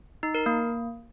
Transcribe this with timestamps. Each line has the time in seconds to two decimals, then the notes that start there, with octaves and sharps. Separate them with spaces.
0.23 D#4
0.35 A#4
0.46 A#3